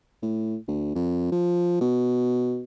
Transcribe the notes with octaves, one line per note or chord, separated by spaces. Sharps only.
A2
D2
F2
F3
B2